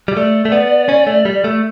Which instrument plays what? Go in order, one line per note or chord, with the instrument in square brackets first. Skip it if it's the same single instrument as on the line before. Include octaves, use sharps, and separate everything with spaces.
[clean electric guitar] G3
[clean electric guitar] A3 [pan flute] D5
[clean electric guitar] A3
B3
C#4
A3
G3
A3